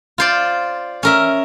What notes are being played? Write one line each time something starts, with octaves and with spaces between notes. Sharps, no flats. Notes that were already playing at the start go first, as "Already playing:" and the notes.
F4 C5 D5
C#4 A#4 E5